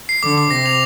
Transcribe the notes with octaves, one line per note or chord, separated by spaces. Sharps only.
C7
D3 D6
D6
C3 A#6
F7